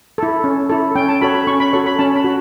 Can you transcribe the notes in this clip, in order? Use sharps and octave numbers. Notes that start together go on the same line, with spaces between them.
E4 A4
C#4
E4 A4
C#4 G5
A5
F#4 A4 C#5 B5
B5
C#4 C#6
B5
F#4 A4 C#5 C#6
B5
C#4 A5
B5
F#4